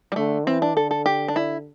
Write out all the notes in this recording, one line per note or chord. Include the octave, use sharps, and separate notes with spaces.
G3
D3 A3
E3 C4
D4
D3 A4
A4
G4
D4
E4